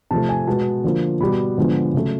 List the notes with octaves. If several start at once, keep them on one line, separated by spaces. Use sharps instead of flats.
C3 F3 A3 A5
G#5
B2 G#3 B3 A5
D3 F3 A#3
B2 G3 B3 B5
D3 F3 G#3 B3
C#3 F#3 A3